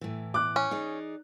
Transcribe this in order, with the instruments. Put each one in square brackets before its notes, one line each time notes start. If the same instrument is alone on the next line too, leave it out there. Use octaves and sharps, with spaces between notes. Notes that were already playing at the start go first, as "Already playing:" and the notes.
[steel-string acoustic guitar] A2 E3
[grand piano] D6 F#6
[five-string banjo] C#4
[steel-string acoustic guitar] D#4 G#4 D5